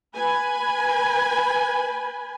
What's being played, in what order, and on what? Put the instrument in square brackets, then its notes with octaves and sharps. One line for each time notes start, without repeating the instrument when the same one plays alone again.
[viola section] B4 G#5